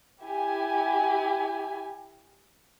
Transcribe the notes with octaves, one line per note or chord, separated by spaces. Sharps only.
E4 G4 G#5